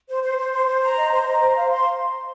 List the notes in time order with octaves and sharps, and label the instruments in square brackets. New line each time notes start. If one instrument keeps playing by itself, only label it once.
[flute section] C5
C5
C5
C5
C5
A#5
D#5
C5
A#5
C5
F5
C6